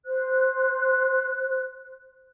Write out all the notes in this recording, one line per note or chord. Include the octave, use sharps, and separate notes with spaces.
C5 F#6